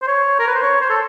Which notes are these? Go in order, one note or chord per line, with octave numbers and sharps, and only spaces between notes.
C5
C#5
A#4
B4
C5
C#5
C5
A4